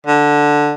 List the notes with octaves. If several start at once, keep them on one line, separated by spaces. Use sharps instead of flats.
D3